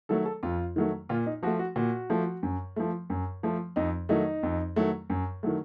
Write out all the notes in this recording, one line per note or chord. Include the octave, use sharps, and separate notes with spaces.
D#3 F#3 A3 A4
A4
F2 F4
D#3 F#3 A3
A#2 F4
D#4
F3 A3 F#4
F#4
A#2 F#4
F3 A3
F#2
F3 A3
F#2
F3 A3
F2 D#4
D#3 F#3 A3 D#4
F2
D#3 F#3 A3
F#2
D#3 F#3 A3